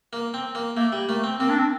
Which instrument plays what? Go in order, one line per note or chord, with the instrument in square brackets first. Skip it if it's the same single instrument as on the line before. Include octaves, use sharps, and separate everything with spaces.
[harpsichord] A#3
C4
A#3
[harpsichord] A3 [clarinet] A#3
[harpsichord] G3
[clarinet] A3 [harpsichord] A#3
[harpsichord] C4
[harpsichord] A#3 [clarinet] C4
[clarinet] D4
C4